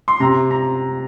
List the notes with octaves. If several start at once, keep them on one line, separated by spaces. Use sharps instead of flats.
C6
C3 A#5
A#5